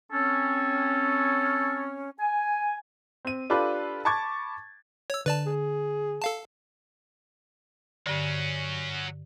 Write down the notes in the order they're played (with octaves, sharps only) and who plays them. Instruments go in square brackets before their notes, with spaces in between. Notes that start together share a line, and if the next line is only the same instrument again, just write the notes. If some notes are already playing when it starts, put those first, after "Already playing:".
[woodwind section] C4 C#4 [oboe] A4
[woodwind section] G#5
[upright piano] C4 D#7
D4 F4 G4 A4 B4 D5
A5 B5 C#6 D6 G#6 A6
[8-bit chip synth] C#5 E6
[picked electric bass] D3 [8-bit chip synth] B4 D5 A5
[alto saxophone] G#4
[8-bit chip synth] A4 F5 A5
[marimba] G2 D3 [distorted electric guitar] F#3 C#4